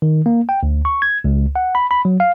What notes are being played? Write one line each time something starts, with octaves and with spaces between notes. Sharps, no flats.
D#3
A#3
G5
D2
C#6
G#6
C#2
F#5
B5
B5
F#3
F5